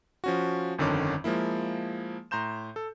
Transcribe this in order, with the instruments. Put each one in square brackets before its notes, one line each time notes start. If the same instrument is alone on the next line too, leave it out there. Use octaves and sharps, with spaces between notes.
[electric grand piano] F3 C#4 F#4
G1 F2 D3 D#3 C#4 D6
F3 G#3 A#3 E4
A2 A#5 C6 G6 E7
A4